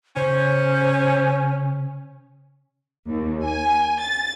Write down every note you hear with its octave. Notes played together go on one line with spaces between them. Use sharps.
C#3 C#4 C5
D#2
G#5
A6